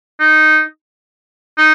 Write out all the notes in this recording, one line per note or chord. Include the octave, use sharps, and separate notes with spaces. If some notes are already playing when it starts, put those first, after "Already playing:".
D#4
D#4